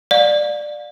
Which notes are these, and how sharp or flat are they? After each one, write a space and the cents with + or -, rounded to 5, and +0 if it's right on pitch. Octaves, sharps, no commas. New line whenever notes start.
D5 +15 F5 +30